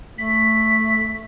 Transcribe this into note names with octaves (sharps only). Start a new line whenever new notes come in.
A3 B6